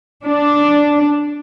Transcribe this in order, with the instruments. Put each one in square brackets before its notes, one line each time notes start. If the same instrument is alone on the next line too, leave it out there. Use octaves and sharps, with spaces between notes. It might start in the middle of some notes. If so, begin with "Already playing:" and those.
[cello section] D4